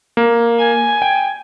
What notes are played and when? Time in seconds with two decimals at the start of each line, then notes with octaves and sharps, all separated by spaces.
0.17 A#3
0.59 G#5
1.02 G5